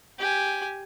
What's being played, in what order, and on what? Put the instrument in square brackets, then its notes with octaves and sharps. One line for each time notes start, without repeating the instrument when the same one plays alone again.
[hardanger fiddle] G4 G#5